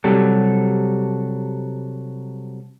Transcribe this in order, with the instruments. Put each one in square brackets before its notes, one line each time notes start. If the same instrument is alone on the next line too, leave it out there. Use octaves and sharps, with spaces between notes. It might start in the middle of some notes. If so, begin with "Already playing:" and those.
[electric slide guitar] C3 F#3 G3 A4